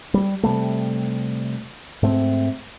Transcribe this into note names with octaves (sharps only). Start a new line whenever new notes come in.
G3
C3 G3 A3
G#2 A3 C4